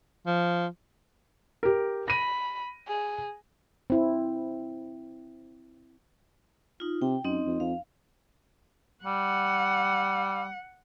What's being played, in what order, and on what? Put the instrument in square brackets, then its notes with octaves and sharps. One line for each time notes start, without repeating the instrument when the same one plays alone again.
[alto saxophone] F3
[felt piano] G4 A#4
[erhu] B5 [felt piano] A#6 D#7
[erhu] G#4
[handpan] C4 E4
[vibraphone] D#4 F4
[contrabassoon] C3 [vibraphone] G5
[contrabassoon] F#2 [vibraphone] C4 D#4 D#5
[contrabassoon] F2
[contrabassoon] F2 [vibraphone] F5
[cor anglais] G3 [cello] F#5